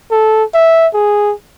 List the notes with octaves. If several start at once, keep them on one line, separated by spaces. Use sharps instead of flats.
A4
E5
G#4